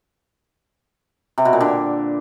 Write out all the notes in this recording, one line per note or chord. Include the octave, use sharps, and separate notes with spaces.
C3
B2
A#2
D3